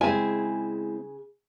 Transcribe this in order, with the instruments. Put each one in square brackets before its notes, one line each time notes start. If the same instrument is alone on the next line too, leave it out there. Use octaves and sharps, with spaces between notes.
[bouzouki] C#3 G#4 [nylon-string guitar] G#3 C4 E4 [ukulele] G#5